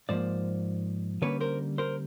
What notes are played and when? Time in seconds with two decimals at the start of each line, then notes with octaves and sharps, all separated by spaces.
0.09 G#2 F3 A#3 C5 D5
1.22 D3 G3 A#3 C#4 B4 C#5
1.41 A#4 C5
1.78 A#4 C5